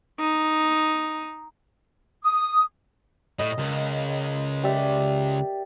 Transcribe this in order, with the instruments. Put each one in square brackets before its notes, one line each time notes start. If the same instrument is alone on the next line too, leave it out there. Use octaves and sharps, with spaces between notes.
[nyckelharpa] D#4
[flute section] D#6
[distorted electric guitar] A2 [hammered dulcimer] D#5
[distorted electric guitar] C#2 [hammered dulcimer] A#4
[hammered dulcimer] G4 D5 E5